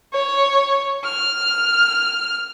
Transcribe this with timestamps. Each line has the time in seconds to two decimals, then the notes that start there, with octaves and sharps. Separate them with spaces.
0.14 C#5
1.05 F6